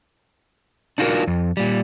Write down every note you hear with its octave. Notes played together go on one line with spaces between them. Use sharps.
D4 D#4 F4 F#4 G#4 A#4
F2
A#2 G3